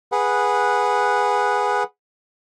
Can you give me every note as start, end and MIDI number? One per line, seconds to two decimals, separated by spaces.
0.12 1.83 68
0.12 1.83 71
0.12 1.83 78